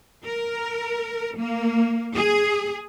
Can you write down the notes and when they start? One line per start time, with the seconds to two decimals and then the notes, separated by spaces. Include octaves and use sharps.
0.25 A#4
1.37 A#3
2.16 G#4